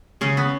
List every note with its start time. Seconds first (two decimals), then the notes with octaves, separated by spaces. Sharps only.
0.21 C#3 C#4
0.37 B3